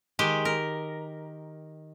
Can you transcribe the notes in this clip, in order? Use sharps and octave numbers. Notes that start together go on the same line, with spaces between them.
D#3 G#3 G4
A#4